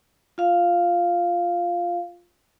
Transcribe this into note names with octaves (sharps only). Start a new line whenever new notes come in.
F4 F5